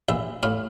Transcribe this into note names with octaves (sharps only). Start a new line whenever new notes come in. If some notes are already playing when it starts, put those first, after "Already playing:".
A#1 E5
A2 F5